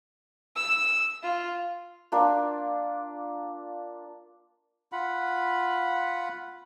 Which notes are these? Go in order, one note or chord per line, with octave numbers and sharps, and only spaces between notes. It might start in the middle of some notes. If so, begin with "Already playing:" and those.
E6
F4
A#3 D4 F4
F4 F#5 B5